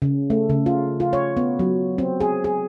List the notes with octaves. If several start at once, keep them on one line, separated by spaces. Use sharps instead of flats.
C#3
A3
C#3
F4
F4
C#5
B3
F#3
C4
G#4
G#4